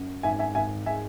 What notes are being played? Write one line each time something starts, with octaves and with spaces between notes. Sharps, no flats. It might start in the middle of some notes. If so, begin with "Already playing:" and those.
Already playing: F#2 F#3
G#1 E5 G#5
E5 G#5
G#1 E5 G#5
G#3 E5 G#5